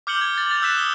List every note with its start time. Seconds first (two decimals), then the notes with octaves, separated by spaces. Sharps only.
0.07 D6 F6 G6 C#7 F#7 G7
0.21 G#6
0.38 A6
0.49 G6 A6 F7 F#7
0.62 E6 F#6 B6 E7
0.74 D6 D#6 G7